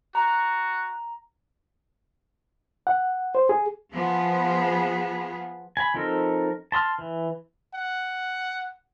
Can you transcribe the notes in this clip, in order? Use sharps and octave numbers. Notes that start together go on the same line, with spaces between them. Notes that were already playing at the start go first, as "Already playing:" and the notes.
F#4 A#5
F#5
C5
G#4
F3 B3 G#4
G#5 B5
F3 C4 D#4 A4 A#4
A5 C6 D#6 F6
E3
F#5